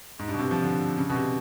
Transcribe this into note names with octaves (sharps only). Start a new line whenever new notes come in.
G#2
G2
B2
C3
F3
D3
C#3
B2
C3